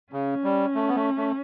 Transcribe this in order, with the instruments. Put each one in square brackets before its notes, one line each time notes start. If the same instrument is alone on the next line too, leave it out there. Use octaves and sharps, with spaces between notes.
[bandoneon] C#3 [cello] C#4
[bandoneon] G3
A3
B3
A3
A3